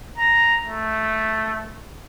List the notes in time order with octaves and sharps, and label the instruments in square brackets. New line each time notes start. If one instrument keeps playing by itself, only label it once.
[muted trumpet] A#5
A3